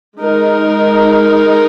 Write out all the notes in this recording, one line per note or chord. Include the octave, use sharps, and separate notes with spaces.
G#3 D#4 A#4